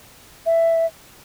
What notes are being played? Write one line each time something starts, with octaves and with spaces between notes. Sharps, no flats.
E5